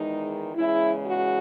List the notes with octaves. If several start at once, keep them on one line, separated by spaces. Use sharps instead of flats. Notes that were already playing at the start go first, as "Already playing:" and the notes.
Already playing: E2 D#3 G#3 D#4
E2 C#3 G#3 E4
F#4